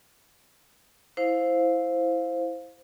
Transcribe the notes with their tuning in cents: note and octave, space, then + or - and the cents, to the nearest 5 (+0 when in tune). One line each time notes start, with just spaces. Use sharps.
E4 +0 C5 +0 F5 +10